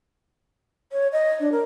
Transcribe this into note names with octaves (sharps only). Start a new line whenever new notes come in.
C#5
D#5
D4
A#4